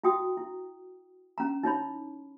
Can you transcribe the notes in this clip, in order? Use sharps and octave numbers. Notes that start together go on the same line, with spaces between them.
E4 F#4 G5 D#6
E4
C#4 A#5
D#4 E4 C#5 B5